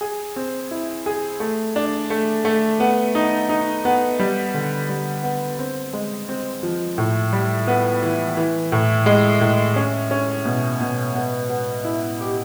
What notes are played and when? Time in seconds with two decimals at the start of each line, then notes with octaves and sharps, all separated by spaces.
0.01 G#4
0.36 C4
0.71 E4
1.06 G#4
1.40 A3
1.76 D4
2.10 A3
2.45 A3
2.80 B3
3.15 D#4
3.49 D#4
3.85 B3
4.20 G3
4.54 D3
4.89 G3
5.24 B3
5.59 C4
5.93 G#3
6.29 C4
6.63 F3
6.98 A2
7.33 G3
7.67 B3
8.02 E3
8.37 E3
8.72 A2
9.06 G#3
9.41 A2
9.76 C#4
10.11 C#4
10.45 B2
10.81 B2
11.15 B3
11.50 B3
11.85 E4
12.21 G4